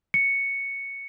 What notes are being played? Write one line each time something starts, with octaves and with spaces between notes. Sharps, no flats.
C#7